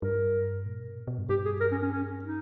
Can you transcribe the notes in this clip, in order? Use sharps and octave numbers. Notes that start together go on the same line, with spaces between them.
G2 A#4
A#2
B2
A#2
B2
G2
G2 G4
G#4
A#4
C#4
C#4
C#4
D#4